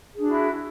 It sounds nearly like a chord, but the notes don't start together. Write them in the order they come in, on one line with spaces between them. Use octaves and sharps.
G#4 D4 F#4 E4